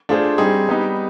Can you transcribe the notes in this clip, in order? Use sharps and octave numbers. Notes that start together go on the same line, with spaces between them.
A3 D4 F4 G#4 C5
G3 C4 D#4 G#4
G3 B3 D#4